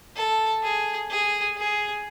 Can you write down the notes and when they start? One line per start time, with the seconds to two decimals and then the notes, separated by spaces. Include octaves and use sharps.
0.16 A4
0.63 G#4
1.10 G#4
1.57 G#4